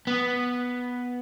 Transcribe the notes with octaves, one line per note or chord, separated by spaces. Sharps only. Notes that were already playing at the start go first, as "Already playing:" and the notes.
B3